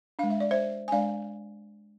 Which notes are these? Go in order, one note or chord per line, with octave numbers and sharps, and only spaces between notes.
G#3 D4 F5
E5
D5
C5 E5
G#5
G#3 D4 D5 F5